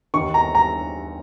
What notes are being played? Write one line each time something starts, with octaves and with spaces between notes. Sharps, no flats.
D#2 D#3 C#6
A#5
A#5